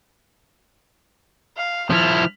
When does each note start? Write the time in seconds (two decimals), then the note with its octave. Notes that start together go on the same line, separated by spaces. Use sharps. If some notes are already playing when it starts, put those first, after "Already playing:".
1.57 F5
1.90 F3 E4 F6